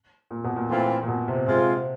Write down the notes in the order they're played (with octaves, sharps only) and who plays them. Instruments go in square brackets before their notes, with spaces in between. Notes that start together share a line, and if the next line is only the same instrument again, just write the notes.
[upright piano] A#2
B2
A#2
[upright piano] A#2 [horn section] E3 A3 C4 F4
[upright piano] A#2
B2
C3
[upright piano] C3 [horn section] G#3 C4 F4